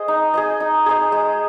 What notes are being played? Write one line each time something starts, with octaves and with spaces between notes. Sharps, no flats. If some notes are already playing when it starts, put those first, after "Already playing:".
Already playing: G#4 C5 D#5
D#4
G#4 C5 D#5
D#4
G#4 C5 D#5
G#3